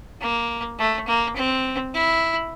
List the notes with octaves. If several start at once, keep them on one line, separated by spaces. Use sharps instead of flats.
A#3
A3
A#3
C4
E4